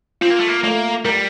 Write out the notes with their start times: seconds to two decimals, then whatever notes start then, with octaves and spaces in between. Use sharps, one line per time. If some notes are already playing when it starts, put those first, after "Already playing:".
0.21 C4 F4
0.30 A#3
0.39 A3
0.48 A#3
0.63 A3 A#3
1.05 G3 A#4